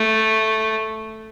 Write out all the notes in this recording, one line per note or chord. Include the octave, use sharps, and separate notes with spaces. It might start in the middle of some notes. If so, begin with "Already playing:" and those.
Already playing: A3